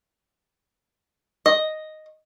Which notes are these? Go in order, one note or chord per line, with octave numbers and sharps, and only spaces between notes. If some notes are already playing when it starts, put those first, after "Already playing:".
D#5